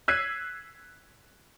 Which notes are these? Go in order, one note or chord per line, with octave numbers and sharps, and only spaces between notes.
E6 F#6 G#6 B6 C7 D#7